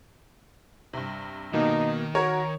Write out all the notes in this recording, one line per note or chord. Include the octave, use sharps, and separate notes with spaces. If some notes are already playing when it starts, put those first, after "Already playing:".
G2 C3
B2 D#3 A#3 D#4
F#4 A#4 C#5 G#6